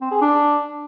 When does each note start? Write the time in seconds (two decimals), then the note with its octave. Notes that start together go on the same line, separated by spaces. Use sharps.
0.01 C4
0.11 G#4
0.21 D4